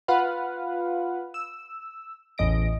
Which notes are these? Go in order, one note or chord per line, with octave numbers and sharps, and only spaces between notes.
F4 B4 F5 F#5
E6
A1 E2 D#5 A#6 D7